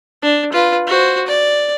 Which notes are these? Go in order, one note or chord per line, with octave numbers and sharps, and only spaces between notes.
D4
F4 B4
F#4 C5
D5